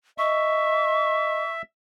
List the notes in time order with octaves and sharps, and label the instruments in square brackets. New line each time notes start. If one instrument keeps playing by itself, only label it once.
[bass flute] D#5 [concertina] E5 [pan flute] C#6